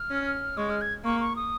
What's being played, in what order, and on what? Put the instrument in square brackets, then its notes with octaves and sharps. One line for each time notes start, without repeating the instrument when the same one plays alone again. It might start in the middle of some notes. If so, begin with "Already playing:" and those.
Already playing: [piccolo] F6
[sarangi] C#4
[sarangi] G#3 [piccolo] C#6
[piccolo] F6
G#6
[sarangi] A#3 [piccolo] C#6
[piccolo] C#6
D#6